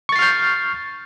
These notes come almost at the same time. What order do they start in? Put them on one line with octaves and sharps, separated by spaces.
C#6 A6 C7 F6 G6